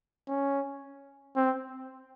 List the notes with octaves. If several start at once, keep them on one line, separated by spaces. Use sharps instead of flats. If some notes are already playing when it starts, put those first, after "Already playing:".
C#4
C4